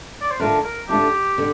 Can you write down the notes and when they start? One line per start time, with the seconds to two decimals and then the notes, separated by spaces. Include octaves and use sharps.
0.21 D5
0.31 C5
0.40 D3 A3 D4 F4 A#4
0.64 A#4
0.88 D3 A3 D4 F4 G4
1.38 D3